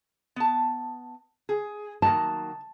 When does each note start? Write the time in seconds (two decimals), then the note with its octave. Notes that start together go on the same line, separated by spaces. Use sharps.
0.36 B3 A5
1.49 G#4
2.02 D#3 F#3 A#3 A5